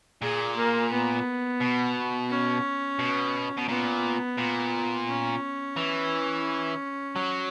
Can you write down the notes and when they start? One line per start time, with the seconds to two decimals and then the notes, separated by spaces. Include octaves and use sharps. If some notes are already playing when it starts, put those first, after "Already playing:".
0.22 A#2 G#4
0.56 A#3
0.91 B3
1.60 B2
2.30 C#4
2.99 B2
3.57 B2
3.68 A#2 B3
4.38 A#2
5.08 C#4
5.77 E3
7.16 F#3